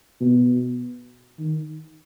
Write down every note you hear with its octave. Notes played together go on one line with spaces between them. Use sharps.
B2
D#3